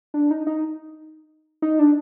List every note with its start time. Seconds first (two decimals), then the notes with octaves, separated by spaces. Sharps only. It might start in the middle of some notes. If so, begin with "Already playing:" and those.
0.14 D4
0.31 D#4
0.47 D#4
1.62 D#4
1.79 D4